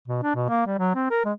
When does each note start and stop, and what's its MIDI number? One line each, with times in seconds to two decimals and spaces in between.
0.08 0.22 47
0.23 0.34 62
0.35 0.46 47
0.49 0.66 58
0.67 0.78 55
0.79 0.92 54
0.95 1.06 60
1.11 1.25 70
1.25 1.32 56